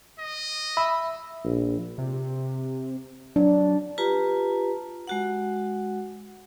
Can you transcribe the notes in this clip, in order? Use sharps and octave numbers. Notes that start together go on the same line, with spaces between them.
D#5
E5 B5
A#1
C3
F#3 D4
F4 G4 B4 A5 A#5
G#3 F#4 F#5